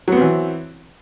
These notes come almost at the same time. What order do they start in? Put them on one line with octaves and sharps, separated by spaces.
F#3 B3 C4 E3